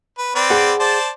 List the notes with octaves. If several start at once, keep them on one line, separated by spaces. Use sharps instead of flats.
B4
C4 B4 D5
G#4 F#5
C5 D5 A5